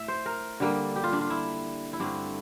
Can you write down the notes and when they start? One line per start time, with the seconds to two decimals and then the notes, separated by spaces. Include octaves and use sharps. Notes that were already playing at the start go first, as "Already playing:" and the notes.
Already playing: A2 E5
0.08 C5
0.26 A#4
0.60 D3 G3 A#3
0.96 G4
1.04 F4
1.13 D4
1.21 F4
1.30 E4
1.93 E4
2.00 G2 D3 A3 C4 D4